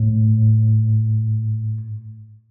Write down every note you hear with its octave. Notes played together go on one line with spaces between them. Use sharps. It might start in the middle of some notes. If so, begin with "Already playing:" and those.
Already playing: A2